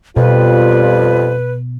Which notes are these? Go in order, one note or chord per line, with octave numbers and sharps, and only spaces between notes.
F2 B2 G3 F4 B4